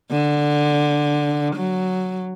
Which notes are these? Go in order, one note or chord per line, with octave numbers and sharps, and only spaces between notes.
D3
F#3